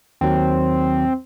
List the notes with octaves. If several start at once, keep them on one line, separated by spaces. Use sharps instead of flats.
D#2 D#3 F#3 C4